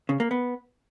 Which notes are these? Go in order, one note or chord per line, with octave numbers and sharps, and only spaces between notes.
C#3
A#3
B3